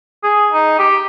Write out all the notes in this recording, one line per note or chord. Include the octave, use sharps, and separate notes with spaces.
G#4
D#4
G4